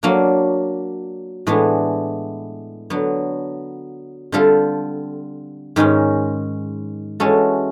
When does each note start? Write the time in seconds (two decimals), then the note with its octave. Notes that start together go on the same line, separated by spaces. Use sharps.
0.03 F#3 A#3 D4
1.47 A2 E3 G#3 B3 D4
2.90 D3 F#3 B3
4.32 D3 G3 C4 F4 A4
5.76 G#2 D#3 G#3 C#4
7.20 E3 G#3 C#4 F#4 A4